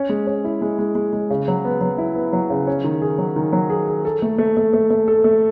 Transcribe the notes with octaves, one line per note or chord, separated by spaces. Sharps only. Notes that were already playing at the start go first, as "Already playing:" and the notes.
Already playing: C#4
G#3
C#4
E4
G#3
G#3
G#3
G#3
C#3
F#3
B3
F#3
E4
B3
F#3
C#3
C#4
D#3
G#4
F#3
D#3
F#3
G#4
G#4
A4
A3
A3
A3
A3
A3
A4
A3